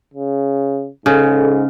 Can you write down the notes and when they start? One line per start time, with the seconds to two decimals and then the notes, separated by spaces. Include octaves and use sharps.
0.14 C#3
1.06 G#2 C#3 A4